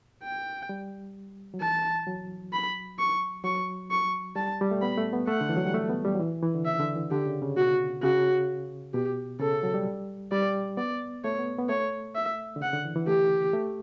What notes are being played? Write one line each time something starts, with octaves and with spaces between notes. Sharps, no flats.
G5
G3
F#3
E3 A5
F#3
B5
C#6
F#3 C#6
C#6
G3 A5
G3
A3
B3 B5
A3
B3
A3 F#5
D3
E3
F#3
G3
A3
B3
G3
F#3
E3
E3
D3
C#3 E5
D3
E3
D3 G4
C#3
C#3
B2 F#4
C#3 F#4
B2 G4
C#3 A4
F#3
G3
G3 D5
B3 D5
A3 C#5
B3
B3
A3 C#5
E5
D3
C#3 F#5
D3
E3
E3
A3 G4
A3